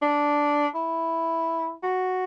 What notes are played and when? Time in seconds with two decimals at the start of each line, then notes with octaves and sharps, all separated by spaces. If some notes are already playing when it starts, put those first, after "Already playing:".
0.02 D4
0.75 E4
1.83 F#4